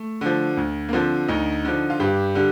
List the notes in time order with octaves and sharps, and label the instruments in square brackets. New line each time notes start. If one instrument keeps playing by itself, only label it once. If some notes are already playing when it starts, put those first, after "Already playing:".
Already playing: [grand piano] A3
D3 F3
D2
A#3
D3 F3 C4
D2 D#4
D3 F3
F4
G2 G4
D3 G3